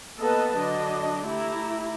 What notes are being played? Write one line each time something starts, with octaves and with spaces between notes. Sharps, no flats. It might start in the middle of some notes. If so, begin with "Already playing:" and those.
A#3 B3 A4 B4 D#5 A5
D3 F#3 D4 D#5
A3 E4 G4 A#5